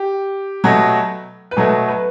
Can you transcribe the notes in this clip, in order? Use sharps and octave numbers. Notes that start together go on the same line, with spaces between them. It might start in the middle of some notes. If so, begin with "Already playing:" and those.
Already playing: G4
B2 F#3 A3
B4
B2 F#3 A3 A4
B4